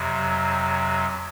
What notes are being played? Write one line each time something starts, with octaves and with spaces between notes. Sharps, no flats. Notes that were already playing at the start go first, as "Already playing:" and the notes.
Already playing: F2 C3 F#3